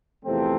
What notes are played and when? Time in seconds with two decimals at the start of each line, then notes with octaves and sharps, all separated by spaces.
0.24 E2 C3 F3 A3 C4